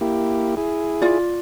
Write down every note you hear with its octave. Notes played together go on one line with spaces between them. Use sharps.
A#3 E4 G4
E4 G#4
F4 D5